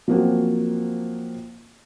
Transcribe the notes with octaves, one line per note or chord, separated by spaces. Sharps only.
F3 F#3 A#3 C4 F#4